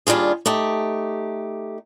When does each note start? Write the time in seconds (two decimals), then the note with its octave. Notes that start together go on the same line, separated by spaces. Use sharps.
0.07 D#2 G3 D4 F4 G#4
0.46 A3 D#4 G4